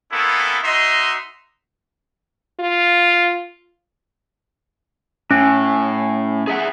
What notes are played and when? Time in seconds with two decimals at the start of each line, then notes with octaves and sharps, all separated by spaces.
0.12 A#3 B3 C#4 E4 A4
0.63 D#4 F#4 D#5 E5 C6
2.60 F4
5.31 A2 C#4
6.47 G#4 E5 F#5